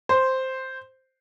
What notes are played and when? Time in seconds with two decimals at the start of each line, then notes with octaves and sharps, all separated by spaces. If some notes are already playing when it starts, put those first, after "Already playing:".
0.09 C5